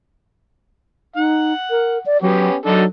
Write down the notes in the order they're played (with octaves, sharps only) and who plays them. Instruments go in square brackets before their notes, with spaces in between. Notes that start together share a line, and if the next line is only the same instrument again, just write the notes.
[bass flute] D#4 [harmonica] F#5
[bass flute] A#4
D5
[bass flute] F#3 [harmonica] B3 C#4 G4
[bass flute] F#3 [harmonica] D4 D#4 A4